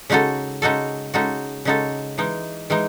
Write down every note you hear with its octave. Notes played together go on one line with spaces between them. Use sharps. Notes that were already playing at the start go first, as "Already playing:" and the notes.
C#3 G#3 D#4 F#4 A4
C#3 G#3 D#4 F#4 A4
C#3 G#3 D#4 F#4 A4
C#3 G#3 D#4 F#4 A4
E3 G#3 D#4
E3 G#3 D#4